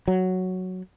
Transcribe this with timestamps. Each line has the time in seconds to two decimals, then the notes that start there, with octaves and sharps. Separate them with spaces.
0.08 F#3